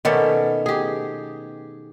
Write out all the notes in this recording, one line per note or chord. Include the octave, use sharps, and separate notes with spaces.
B2 D#3 A3 B3 C#4 D5
G4 G#4